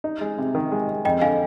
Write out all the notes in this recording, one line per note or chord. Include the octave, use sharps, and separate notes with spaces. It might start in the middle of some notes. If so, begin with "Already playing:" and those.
D#4
G#3
C3
D#3
G#3
G#3
F2 D#5 G5
D3 F5 G#5